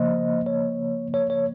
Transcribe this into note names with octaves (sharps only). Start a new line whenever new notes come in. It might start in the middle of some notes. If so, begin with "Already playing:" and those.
Already playing: C#3 F3 A#3 C5 D#5
C#5
C#5
C#5